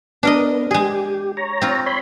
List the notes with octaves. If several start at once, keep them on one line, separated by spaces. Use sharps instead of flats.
B3 D4 A#4 D#5
G#3 G4 G#4
C#5 A#5
C4 F4
C#5 B5 C6